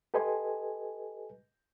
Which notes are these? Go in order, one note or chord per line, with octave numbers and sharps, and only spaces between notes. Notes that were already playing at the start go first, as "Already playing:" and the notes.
G4 A4 B4 D#5 G#5 C6